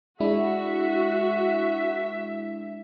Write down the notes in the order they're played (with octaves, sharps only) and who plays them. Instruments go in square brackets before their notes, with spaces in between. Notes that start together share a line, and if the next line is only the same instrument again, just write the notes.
[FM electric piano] G#3 D4 E4 [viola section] F#4 [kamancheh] E5